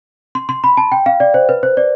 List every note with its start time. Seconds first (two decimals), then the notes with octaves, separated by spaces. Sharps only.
0.35 C6
0.49 C6
0.64 B5
0.77 A5
0.92 G5
1.06 F5
1.20 D5
1.34 C5
1.49 B4
1.63 C5
1.77 D5